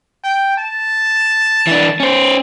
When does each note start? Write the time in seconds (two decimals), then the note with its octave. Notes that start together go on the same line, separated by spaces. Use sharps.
0.24 G5
0.58 A5
1.67 E3 D4
2.00 C#4 C5